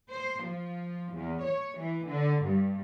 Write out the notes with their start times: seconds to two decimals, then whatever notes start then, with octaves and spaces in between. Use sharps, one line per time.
0.10 C5
0.43 F3
1.13 E2
1.42 C#5
1.79 E3
2.07 D3
2.43 G2